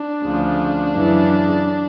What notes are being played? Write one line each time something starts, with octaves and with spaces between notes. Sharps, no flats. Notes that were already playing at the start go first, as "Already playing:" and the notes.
Already playing: D4
D2 C#3 F3
F#2 C#3 E3